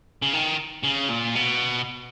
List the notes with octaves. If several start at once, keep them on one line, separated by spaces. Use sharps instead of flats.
C#3
D#3
C#3
A#2
B2